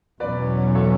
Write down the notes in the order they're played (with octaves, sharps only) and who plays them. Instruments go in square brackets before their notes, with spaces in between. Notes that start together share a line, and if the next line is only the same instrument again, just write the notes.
[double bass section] E2 B2 F#3 C#4 [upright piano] B4 D5
[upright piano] A4 C#5